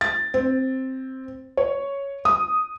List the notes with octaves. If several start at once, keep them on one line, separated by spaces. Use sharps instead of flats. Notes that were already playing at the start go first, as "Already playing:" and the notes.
A6
C4
C#5
D#6